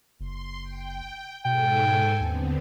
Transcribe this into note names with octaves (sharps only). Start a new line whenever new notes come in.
F#1 C6
G5
G#2 B2 A4 G5 G#5
D#2 D3 B3 C4